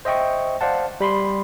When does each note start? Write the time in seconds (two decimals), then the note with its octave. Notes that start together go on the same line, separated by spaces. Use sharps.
0.05 C5 D#5 E5 G5 C#6
0.61 C5 D5 F5 F#5 A5
1.00 G3 B5 C6